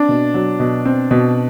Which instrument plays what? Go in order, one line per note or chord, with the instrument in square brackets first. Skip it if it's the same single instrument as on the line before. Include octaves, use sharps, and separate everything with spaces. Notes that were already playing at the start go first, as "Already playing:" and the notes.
Already playing: [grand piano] C4 [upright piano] D4
[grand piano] B2
F#3
B2
C4
B2